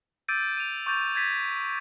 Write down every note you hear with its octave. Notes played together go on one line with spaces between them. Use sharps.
D6 E6 G6 A6 D7 D#7
D#7 F7
C#6 D6 G6 A6 F7
G#6 A6 B6 D#7